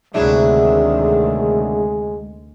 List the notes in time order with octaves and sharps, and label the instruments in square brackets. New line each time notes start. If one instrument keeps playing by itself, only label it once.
[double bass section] D2 C3 D#3 [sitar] F#3 D4 E4 [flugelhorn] G#3 [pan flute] G#4